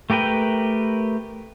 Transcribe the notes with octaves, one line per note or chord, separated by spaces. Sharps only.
A3 G4 A#4 B4 G5